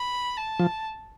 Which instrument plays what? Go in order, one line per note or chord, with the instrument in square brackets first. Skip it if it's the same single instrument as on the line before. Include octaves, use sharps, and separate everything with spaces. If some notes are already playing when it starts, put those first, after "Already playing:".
Already playing: [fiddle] B5
A5
[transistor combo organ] F3